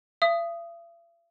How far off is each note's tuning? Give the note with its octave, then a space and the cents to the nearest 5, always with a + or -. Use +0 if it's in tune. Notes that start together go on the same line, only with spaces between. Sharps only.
E5 +45 D#6 +0